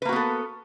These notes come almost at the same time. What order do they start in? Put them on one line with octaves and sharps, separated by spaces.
B4 A#3 F#4 B3 A4